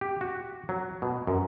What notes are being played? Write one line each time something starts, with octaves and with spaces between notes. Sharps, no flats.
G4
F#4
F#3
B2
F#2